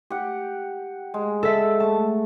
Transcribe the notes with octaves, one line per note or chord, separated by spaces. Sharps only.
G4 F#5
G#3
A4 E5
A3 A5